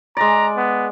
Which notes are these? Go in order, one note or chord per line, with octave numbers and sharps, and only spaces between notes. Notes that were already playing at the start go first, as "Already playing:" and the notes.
G#3 D5 A#5
B3